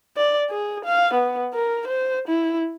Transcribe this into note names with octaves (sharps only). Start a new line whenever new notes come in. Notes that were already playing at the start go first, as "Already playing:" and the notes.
D5
G#4
F5
B3
A#4
C5
E4